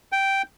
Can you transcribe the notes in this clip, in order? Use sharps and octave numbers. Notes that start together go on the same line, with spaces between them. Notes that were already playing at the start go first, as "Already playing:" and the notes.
G5